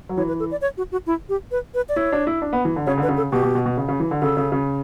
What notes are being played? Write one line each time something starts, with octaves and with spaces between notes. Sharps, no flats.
F#3
E3 C#5
B4
A4
D5
C#5
F#4
F#4
E4
G4
B4
B4
D5
E4 C#5
D4
E4
D4
B3
E3
D3
C#3 C#5
D3
B4
C#3
A4
B2 G4
B2
B2
B2
C#3
C#3
E3
D3
C#3 A4
C#3
C#3